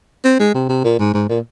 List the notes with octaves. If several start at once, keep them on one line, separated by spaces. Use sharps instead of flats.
C4
G#3
C3
C3
A#2
G#2
G#2
A#2